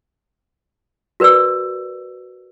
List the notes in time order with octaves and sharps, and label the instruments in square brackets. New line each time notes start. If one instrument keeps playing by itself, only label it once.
[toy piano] F#4 A#4 B4 D5 E6